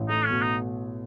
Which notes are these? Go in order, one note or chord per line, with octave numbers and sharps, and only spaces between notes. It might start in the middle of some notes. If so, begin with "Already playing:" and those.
Already playing: A1
A3 D#4
C#4
B2
D#4